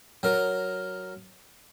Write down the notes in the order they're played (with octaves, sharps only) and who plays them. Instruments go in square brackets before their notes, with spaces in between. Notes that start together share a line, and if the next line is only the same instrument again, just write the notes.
[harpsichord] F#3 A#4